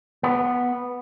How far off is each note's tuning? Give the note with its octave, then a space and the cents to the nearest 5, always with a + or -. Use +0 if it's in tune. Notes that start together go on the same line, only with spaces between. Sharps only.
B3 -5